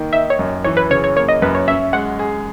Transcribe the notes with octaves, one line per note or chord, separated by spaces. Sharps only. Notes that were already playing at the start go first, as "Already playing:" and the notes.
Already playing: D#3 A#3
D#4 E5
C#5
F#2
E3 C#5
B4
C#3 C#5
C#5
A#3 C#5
D#5
F#2 B4
C#5
C#4 E5
G#3 F#5
G#4